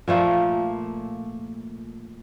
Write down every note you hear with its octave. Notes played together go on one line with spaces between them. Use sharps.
A#2 F3 A3 A#3